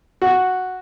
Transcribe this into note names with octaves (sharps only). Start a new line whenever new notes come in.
F#4